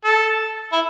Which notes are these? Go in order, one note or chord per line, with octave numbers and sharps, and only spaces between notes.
A4
E4